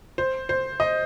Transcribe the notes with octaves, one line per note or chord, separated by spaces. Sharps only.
C5
C5
D#5